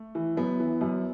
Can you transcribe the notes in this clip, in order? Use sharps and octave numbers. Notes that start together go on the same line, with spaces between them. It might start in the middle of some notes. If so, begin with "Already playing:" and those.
Already playing: A3
E3
F#2 B3
E3
F#2